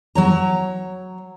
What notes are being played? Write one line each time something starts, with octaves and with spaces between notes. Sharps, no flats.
F#3 C#5 A#5